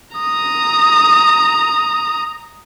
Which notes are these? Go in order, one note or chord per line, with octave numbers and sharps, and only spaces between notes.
A#5 D#6